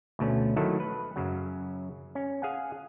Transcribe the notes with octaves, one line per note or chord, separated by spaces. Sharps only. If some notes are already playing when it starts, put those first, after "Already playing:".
D2 B2 A3 C#4
D#3 F#3 A3 E4 F#4 A4
B4
F#2 C#3 F#3
C#4
G#4 F5 F#5 G#5